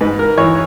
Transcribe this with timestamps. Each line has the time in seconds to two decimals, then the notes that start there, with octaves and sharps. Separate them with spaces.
0.01 G#2 B4
0.19 A#4
0.37 E3 C#5